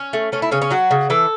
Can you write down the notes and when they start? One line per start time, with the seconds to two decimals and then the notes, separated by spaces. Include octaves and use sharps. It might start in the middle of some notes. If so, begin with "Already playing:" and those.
Already playing: C#4
0.13 A3
0.32 A3 C#4
0.42 E4
0.51 C#3 C#4
0.62 C#4
0.71 F#3 F#4
0.91 C#3
1.10 E3 A4